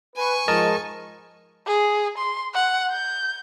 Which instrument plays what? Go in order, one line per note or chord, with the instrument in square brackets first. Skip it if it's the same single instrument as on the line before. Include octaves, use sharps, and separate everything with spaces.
[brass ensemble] B4 [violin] G#5 C#6
[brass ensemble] G#2 F3 [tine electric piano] A#4 D#5 A5
[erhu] G#4
C6
F#5
G6